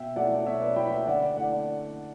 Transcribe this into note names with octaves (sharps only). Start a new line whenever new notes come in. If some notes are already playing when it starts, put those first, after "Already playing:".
Already playing: B2 E5 G5
F#3 A3 E4 D5 F#5
B2 C#5 E5
B4 D5
F#3 A3 E4 G5 B5
E5 G5
D3 D5 F#5
A3 E4 D5 F#5